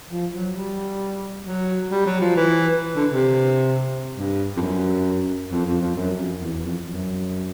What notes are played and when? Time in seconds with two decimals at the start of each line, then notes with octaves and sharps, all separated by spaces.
0.11 F3
0.33 F#3
0.56 G3
1.46 F#3
1.91 G3
2.06 F#3
2.21 F3
2.36 E3
2.96 D3
3.11 C3
4.16 G2
4.57 F2
4.61 F#2
5.51 F2
5.66 F2
5.81 F2
5.96 F#2
6.18 F2
6.41 E2
6.63 F2
6.86 F#2